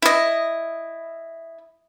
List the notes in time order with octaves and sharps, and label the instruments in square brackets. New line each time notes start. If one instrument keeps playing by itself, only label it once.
[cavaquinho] E4 D#5